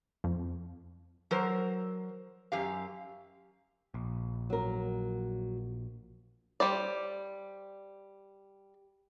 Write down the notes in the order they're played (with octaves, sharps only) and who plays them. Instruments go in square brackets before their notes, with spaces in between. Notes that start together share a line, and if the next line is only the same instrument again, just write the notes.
[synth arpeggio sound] F2
[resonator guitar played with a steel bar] F#3 A#4 C5
F#2 G4 F5
[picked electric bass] A#1
[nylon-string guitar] F#3 A#4
[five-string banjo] G3 C5 D5